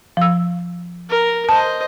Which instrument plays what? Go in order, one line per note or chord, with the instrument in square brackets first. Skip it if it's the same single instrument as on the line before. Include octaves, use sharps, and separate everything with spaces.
[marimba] F3 E6
[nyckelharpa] A#4
[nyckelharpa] C5 D#5 [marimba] A5